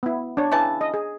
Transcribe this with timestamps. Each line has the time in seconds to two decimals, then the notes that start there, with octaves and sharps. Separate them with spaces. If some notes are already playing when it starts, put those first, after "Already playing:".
0.03 B3 E4
0.37 D4 C#5
0.51 C#3 E3 A5
0.81 D#5
0.94 G#4